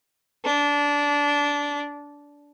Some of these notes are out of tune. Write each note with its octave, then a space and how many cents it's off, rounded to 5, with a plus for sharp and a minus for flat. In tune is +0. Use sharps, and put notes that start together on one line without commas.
D4 -20